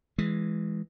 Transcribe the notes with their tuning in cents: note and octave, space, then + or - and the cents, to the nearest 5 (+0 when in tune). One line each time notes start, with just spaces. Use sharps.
E3 +0 G#3 +0